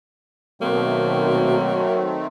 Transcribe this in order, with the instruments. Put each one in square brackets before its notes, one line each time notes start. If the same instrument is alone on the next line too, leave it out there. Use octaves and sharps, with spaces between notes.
[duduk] B2 [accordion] D#3 A3 C4 [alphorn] F#3 [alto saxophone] A#3